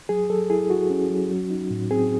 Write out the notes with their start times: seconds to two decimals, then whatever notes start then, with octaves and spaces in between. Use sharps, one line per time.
0.09 F#3 G#4
0.30 F#3 A4
0.50 E4 G#4
0.70 E4 F#4
0.90 C#4
1.10 F#3
1.31 F#3
1.51 D#4
1.71 A2
1.91 C4 G#4